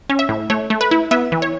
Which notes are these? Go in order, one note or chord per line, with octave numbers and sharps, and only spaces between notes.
C#4
E5
A2
A3 C#5
A3
B4
E4
B3 E5
E3
C#5